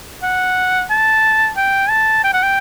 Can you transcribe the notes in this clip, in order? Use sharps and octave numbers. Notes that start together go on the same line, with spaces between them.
F#5
A5
G5
A5
G5
F#5
G5